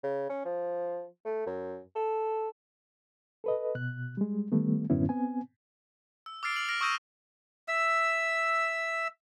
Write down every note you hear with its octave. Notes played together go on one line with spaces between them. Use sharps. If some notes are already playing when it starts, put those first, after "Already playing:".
C#3
C#4
F3
A3
F#2
A4
A4 B4 D#5
B2 F#6
G3 G#3
D#3 G3 A3 B3
F#2 A2 D3 B3 C#4 E4
B3 C4 G#5
E6
D6 E6 F6 A6 C7 D7
F6 D7 F7 F#7
F6 A#6 D7 F#7
C#6 D#6 E6 G6 A#6 D#7
E5 E6